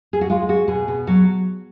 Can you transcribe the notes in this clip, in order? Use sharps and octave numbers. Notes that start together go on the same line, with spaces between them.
G#4
F#4
G#3 F4
G#3 F#4
B2 G#4
B2
F#3 F#4